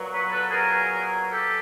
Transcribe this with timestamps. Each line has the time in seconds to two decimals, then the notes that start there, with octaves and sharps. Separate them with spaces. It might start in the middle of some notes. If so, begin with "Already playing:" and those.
Already playing: A#2 F#3 B3
0.12 B4 C#5
0.32 A4 B4
0.51 G#4 A#4
1.31 G4 A4